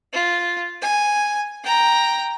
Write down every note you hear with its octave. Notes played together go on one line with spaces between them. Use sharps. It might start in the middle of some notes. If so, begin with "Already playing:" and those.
F4
G#5
G5 A#5